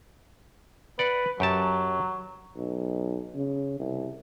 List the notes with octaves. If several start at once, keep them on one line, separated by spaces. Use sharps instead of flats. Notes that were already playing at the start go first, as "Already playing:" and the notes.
B4 D5 F#5
F#2 F#3 G4 A5
B1
C#3
C2